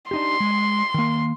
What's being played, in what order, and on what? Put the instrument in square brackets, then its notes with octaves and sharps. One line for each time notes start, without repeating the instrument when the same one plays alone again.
[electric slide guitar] D4 D#4 G4 [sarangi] C6
[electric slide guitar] G#3
D#3 A#3